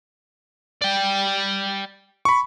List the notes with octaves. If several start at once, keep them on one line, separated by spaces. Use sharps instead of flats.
D5 G5
B5 C#6